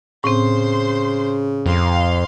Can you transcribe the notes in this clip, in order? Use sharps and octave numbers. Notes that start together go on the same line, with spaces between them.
A2 C#3 C4 C5 C6
F2 F5 C6